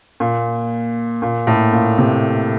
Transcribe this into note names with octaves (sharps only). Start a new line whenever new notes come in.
A#2
A#2
A2
A#2
C3